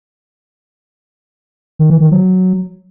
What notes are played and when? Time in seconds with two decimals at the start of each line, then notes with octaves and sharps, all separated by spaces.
1.79 D#3
1.90 E3
2.01 D#3
2.11 F#3